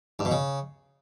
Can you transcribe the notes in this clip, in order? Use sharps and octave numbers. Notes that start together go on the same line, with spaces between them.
G2
B2
C#3